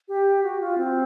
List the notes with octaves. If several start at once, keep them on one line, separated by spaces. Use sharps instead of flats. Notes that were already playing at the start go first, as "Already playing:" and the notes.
G4
F#4
F4
C4